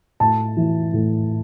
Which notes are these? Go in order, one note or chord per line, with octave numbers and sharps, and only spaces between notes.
A2 A5
E3
A2